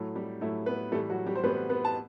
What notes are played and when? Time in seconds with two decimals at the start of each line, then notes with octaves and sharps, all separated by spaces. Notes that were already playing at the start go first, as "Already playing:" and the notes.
Already playing: A2 F#3 A3
0.16 G3 G4
0.41 A2 F#3 A3 E4
0.66 B3 B4
0.92 A2 E3 G3 A3 A4
1.09 F#3 F#4
1.26 G3 G4
1.35 C5
1.43 A2 E3 G3 B3 B4
1.69 B3 B4
1.85 A5